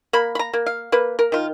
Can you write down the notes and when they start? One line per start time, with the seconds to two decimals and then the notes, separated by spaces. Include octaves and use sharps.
0.13 A#3 B5
0.35 B5
0.39 A#5
0.53 A#3
0.66 F5
0.92 A#3 B4
1.19 A#4
1.32 D#3 F4